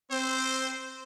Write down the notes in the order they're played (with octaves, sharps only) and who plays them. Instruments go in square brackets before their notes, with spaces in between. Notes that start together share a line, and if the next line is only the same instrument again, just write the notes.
[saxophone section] C4 [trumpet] C5